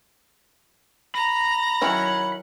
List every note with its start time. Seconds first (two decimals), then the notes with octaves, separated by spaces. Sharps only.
1.15 A#5 B5 A#6
1.81 D#3 F#3 C#4 E4 F#5